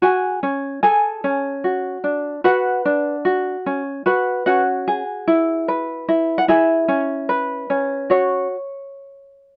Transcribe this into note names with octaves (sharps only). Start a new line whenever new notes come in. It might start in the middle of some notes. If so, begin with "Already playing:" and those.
F#4 G#4 G#5
C#4
G#4 A4 G#5
C#4
F#4
D4
F#4 B4 F#5
D4
F#4
C#4
F#4 B4 F#5
C#4 F#4 F#5
G#4
E4
B4
E4
F#5
E4 G#4 E5
C#4
B4
C#4
F#4 C#5